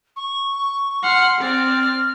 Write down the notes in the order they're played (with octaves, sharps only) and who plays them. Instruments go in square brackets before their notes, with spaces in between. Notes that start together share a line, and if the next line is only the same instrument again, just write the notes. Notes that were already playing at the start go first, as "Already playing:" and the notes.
[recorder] C#6
[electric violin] F#5 C6 [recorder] F6
[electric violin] C4 D5 [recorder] F6